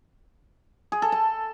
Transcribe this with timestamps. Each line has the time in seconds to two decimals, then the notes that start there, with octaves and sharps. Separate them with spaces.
0.92 G#4
1.02 A4
1.12 A5